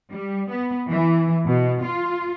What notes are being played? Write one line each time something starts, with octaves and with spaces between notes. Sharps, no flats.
G3
B3
E3
B2
F4